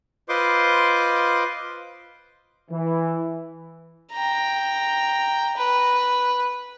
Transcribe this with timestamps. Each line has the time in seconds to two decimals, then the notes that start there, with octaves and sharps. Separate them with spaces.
0.29 F4 B4 C5 D#5 C6 D6
2.71 E3
4.13 G5 A#5
5.57 B4